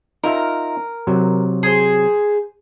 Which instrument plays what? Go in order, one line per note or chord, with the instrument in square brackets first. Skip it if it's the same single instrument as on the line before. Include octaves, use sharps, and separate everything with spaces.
[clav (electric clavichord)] D#4 F4 E5 [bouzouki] A#4
[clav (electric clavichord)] C3 F#3
[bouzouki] G#4 C5